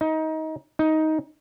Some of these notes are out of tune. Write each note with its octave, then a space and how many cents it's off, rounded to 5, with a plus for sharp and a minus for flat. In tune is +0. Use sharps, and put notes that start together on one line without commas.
D#4 +25
D#4 +15